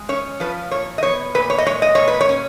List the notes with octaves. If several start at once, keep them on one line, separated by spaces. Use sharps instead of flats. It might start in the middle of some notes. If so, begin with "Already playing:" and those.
Already playing: G#3
C#4 C#5
F3 B4
A#2 C#5
D#5
B3 C#5
A#2 B4
C#5
D#5
G#3 C#5
D#5
A#2 C#5
B4
C#5
C#4